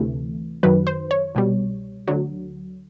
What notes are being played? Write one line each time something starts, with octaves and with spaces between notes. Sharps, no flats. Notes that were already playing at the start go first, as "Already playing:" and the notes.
Already playing: D2 C3 E3 A3
F#2 D#3 F#3 B4
C5
C#5
C2 B2 G3
D2 D3 F#3